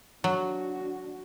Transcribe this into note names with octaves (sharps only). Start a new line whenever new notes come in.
F#3 D4 F#4